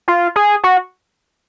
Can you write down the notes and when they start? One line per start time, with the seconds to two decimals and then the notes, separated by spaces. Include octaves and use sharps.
0.08 F4
0.36 G#4
0.63 F#4